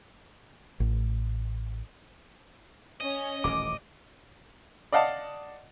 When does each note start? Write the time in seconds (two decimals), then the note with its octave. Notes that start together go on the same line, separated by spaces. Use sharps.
0.80 A1
3.01 C#4 D#5
3.44 D#1 A1 D6
4.92 D5 D#5 F5 F#5 A5